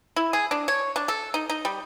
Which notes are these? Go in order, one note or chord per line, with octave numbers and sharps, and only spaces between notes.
E4
G#4
D4
C#5
D4
A4
D#4
D#4
G3